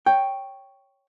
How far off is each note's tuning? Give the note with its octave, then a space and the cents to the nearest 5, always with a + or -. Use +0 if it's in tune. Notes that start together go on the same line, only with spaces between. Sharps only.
C#5 +0 G5 +0